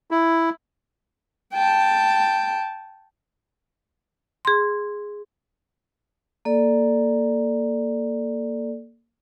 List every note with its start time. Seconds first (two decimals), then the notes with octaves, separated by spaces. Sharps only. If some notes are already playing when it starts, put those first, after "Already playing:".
0.11 E4
1.54 G5 A5
4.45 G#4 C6
6.45 A#3 A4 D5